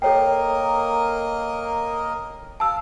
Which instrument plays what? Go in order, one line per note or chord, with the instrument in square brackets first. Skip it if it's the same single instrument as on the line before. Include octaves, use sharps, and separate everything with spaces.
[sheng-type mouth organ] A#3 A#4 D#5 [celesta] A4 C#5 G5
[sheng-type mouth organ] F5 [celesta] A5 E6